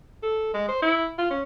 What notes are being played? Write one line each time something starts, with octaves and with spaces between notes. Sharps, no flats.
A4
G#3
C5
E4
F4
C#4